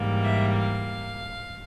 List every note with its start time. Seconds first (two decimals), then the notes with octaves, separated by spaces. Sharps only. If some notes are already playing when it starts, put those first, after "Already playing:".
Already playing: G#2 E3 G3 A#3
0.23 E5
0.54 F5